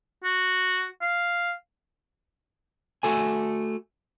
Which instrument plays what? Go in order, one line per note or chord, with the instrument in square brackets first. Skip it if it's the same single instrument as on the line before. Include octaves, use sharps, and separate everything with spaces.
[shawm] F#4
F5
[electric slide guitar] A3 F#4 A4 G#5